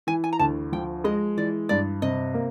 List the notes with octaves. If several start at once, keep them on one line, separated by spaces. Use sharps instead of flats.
E3 G#5
G#5
A#5
D2 A5
F3 G5
G#3 D#5
E3 D5
G2 D5
C3 D#5
A#3